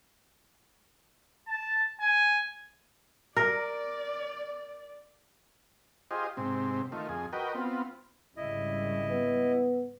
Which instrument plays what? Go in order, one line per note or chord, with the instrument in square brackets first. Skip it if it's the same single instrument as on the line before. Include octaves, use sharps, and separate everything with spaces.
[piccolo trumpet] A5
G#5
[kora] A#4 [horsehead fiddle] D5
[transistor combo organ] F4 G4 G#4 C5 D#5
G#2 C3 C4
D#3 A3 F4
F2 G#4
F#4 A#4 B4 D#5 G5
B3 C4 F4
[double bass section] G#1 C#3 G3 [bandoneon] E4 D#5
[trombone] B3